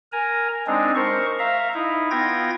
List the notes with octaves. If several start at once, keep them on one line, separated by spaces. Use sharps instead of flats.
A#4 G#5 A#5
G#3 C4 D4 D#4
A#4 C5 C#6
E5 F5 A#5
D#4 E4
B3 F4 G5 G#6 A#6